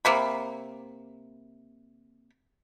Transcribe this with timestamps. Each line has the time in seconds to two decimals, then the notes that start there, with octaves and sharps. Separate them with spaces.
0.05 C3 A#3 B5